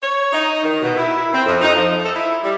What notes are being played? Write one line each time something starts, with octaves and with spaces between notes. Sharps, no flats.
C#5
D#4
D#3
B2
E4
C4
F2
D#4
F3
A4
E4
G3